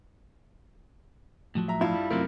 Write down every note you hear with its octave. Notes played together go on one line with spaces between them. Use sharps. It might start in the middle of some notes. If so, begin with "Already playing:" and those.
A2 F3 F#3
E5 A#5
G2 E4 F4
G3
F#2 C3 F#3 A3 C4 A#4